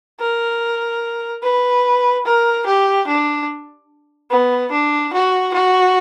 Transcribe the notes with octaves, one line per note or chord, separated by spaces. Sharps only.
A#4
B4
A#4
G4
D4
B3
D4
F#4
F#4